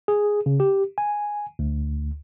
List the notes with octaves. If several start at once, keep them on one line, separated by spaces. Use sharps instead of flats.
G#4
C#3
G4
G#5
D2